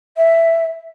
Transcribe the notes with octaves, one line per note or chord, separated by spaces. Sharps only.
E5